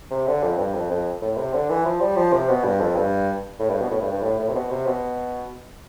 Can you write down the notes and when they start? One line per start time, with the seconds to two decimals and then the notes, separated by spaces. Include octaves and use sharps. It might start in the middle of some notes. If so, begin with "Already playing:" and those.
0.11 C3
0.27 D3
0.43 F2
0.58 G2
0.74 F2
0.91 F2
1.22 A2
1.37 C3
1.53 D3
1.70 E3
1.85 F3
2.00 G3
2.16 F3
2.33 C3
2.49 B2
2.64 G2
2.80 F2
2.96 G2
3.60 A2
3.70 G2
3.81 B2
3.91 A2
4.01 G2
4.12 G2
4.22 A2
4.39 A2
4.49 C3
4.55 B2
4.70 C3
4.86 B2